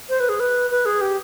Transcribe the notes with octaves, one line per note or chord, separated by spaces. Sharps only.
C5
B4
G#4
B4
B4
G#4
G4